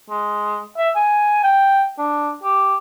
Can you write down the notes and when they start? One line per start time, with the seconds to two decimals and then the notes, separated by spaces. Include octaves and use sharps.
0.10 G#3
0.78 E5
0.95 G#5
1.44 G5
1.98 D4
2.43 G4